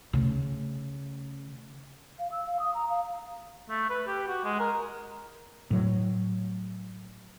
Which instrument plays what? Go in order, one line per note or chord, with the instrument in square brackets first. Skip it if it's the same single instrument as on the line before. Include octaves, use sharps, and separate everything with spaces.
[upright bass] C#3 A3
[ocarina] F5
E6
F5
D#6
A#5
F5
[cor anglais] A3
B4
G4
F#4
G#3
A#4
[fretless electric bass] A2 F#3